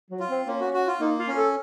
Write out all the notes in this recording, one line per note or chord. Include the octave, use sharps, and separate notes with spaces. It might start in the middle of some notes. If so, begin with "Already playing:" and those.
F#3
F4
C4
A#3 C#4
F#4
F#4
F4
A#3 D#4
F4
C#4
A4